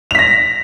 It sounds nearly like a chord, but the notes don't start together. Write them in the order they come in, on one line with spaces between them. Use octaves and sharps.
F7 B6 A#6